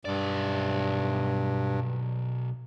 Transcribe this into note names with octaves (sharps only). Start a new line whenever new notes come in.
B1 G2 D5